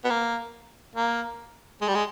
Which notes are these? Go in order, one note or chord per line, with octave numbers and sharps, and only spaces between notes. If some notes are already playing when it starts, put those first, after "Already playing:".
B3
A#3
A#3
G#3
G3
G#3